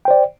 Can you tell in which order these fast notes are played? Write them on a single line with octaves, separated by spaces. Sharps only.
G5 C5 D5